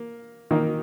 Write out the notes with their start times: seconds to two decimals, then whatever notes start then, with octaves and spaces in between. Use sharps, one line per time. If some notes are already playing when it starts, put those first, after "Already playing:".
Already playing: A#3
0.51 D#3 A#3 D#4